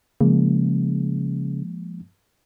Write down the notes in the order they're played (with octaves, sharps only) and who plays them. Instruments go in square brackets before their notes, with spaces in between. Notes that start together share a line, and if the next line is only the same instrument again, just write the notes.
[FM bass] C#3 [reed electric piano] F3 G#3 A#3